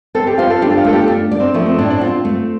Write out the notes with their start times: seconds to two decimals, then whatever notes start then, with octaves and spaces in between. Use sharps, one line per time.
0.15 C4 A4
0.27 G4
0.38 F4 C5
0.50 A4
0.62 D4 G4
0.77 F4
0.85 A3 A4
0.93 G4
1.08 D4
1.31 D5
1.40 C4
1.54 F3 A3
1.66 C4
1.78 A2 D4
1.90 D4
2.01 C4 F4
2.25 A3